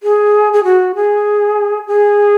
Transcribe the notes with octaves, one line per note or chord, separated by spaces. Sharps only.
G#4
G#4
F#4
G#4
G#4